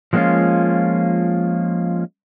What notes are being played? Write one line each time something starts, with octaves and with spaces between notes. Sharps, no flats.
F3 G#3 A#3 C4 C#4 F4